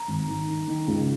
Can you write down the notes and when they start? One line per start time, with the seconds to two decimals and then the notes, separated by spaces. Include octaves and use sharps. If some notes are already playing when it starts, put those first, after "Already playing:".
Already playing: A#5
0.08 G#1
0.28 D#3
0.48 D#3
0.68 D#3
0.87 C#2